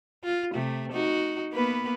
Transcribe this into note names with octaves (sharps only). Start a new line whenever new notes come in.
F4
C3 A3
D#4 F#4
A#3 B3 B4